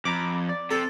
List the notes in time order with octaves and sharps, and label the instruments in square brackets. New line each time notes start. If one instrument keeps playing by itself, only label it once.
[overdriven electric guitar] F2 [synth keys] A#5 B5 D6
[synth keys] D5
[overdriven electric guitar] C3 [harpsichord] A4